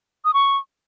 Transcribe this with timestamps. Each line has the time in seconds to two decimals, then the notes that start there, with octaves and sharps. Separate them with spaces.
0.25 D#6
0.34 C#6